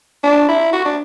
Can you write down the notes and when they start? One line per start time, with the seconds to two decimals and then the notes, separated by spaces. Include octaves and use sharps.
0.23 D4
0.48 E4
0.73 F#4
0.85 D4